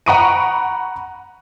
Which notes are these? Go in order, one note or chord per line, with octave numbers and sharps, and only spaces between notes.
F#5 A#5 B5 C#6 D7 D#7